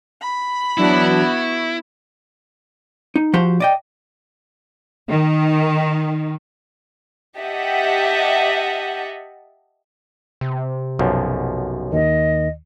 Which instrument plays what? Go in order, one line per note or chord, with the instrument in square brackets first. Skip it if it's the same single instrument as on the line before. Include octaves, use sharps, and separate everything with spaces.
[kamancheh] B5
[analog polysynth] E3 F#3 D4 [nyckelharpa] B3 F#4 [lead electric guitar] E4
[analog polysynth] C#6
[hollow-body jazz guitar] D#4
F3 F#4 G4 C5 C6
D5 D#5 G5
[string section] D#3
[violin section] G4 D#5 E5 F#5 A5
[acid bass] C3
[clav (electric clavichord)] B1 F#2 F3
[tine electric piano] D#2 D#3 [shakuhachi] D#5